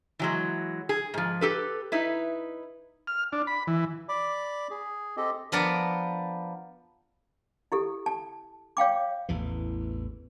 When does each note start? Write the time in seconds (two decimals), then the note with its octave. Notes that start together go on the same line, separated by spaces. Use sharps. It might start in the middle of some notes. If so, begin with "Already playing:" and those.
0.19 E3 F#3 G#3
0.89 G#4
1.14 G#2 F3
1.41 G4 A4 B4
1.92 D#4 E4 B4
3.07 F6
3.32 D4
3.47 B5
3.67 E3
4.09 D5 B5 D6
4.71 G#4
5.17 C4 G4 A4 D#5
5.52 F3 B3 D4 A#4 D5
7.72 E4 G4 A4
8.06 A5
8.77 C#5 F5 G5 D6
9.29 A1 E2 E3